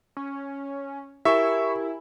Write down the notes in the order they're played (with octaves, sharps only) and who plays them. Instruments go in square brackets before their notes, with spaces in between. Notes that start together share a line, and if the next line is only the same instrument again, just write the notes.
[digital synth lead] C#4
[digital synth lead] E4 [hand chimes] G4 A#4 G#5 [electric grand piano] E5 C#6